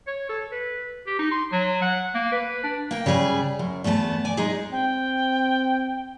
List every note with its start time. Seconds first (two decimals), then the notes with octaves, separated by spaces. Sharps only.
0.07 C#5
0.29 A4
0.52 B4
1.07 G4
1.19 D#4
1.31 C6
1.52 F#3
1.82 F#5
2.15 A#3
2.32 B4
2.64 D4
2.91 A#3 G5
3.06 C#3 G3 G#4 B4
3.59 F#2
3.84 E2 A3 B3 B4 A5
4.25 D5 G#5
4.37 G#3 D#4 G#4
4.72 C4 G5